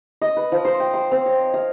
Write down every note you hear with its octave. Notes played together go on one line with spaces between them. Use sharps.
D#5
B4
F3
C5
G5
C6
C4
C#5
F5